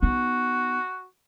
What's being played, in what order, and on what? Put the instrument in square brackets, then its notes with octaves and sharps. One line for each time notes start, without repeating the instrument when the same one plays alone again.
[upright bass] B3 D#4 [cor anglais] F#4